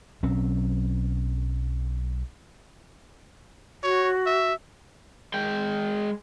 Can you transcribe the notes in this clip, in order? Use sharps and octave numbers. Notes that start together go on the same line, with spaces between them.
B1 F#3 C4 C#4
F#4 C#5
E5
G#3 G5